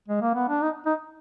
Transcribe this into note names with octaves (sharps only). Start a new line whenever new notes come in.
G#3
A#3
B3
D4
D#4
D#4